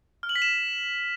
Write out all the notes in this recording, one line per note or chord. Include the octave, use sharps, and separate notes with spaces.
F6
F#7
B6
E7